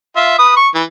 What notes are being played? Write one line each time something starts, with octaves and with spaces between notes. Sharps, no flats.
F4 E5
B4 D#6
C#6
E3